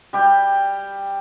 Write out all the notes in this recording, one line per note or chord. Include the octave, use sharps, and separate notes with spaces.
G3 G4 G5